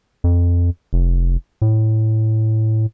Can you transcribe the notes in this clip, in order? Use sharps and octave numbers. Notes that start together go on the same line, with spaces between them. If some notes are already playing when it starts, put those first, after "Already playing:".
F2
F1
A2